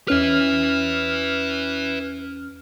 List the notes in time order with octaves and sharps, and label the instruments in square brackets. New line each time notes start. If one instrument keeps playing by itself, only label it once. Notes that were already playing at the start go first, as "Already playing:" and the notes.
[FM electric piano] E2 C#4 F6 [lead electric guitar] B4 E5